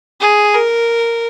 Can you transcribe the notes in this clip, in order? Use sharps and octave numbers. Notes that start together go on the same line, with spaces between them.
G#4
A#4